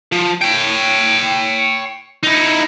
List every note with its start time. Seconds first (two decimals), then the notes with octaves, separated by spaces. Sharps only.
0.12 F3
0.42 C#5 G5
2.23 D#4 E4